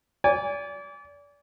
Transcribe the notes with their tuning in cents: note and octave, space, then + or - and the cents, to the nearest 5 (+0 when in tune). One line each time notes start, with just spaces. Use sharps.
D5 -35 G#5 -20